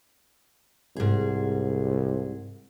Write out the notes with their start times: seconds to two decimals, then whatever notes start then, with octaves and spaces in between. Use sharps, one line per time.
0.96 C2 G#2 G#4